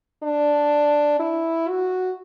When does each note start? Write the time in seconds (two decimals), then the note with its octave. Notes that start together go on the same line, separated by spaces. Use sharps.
0.23 D4
1.20 E4
1.69 F#4